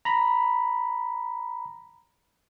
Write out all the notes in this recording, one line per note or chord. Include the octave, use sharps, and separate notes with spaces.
A#5 B5